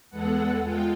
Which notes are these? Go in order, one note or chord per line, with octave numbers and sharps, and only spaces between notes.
E2 G#3 B3 A4 F#5
G#3 F4 G5